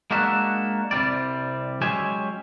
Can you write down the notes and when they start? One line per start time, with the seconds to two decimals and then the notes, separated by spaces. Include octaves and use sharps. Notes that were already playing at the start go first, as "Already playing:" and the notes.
0.11 G#3 A#3 D4 F#4 E5
0.91 C2 C3 D#3 G3 D5
1.81 F#3 G#3 C#4 G4 E5 G#5